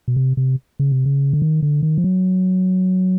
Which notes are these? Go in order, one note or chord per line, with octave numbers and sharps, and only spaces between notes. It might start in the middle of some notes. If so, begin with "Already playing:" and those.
B2
C3
C3
C#3
C3
C#3
D3
D#3
D3
D#3
F3
F#3